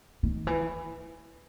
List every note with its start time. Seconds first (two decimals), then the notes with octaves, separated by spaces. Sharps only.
0.23 D#3
0.47 E3